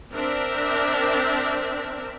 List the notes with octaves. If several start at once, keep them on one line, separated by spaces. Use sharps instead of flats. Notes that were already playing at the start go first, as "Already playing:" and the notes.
C4 D4 A#4 E5